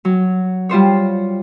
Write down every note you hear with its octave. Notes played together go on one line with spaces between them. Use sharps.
F#3
G3 F4 C5 C#5